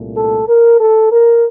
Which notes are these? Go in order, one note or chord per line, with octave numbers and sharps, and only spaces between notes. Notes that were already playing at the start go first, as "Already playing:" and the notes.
Already playing: C2 A#2 A3
A4
A#4
A4
A#4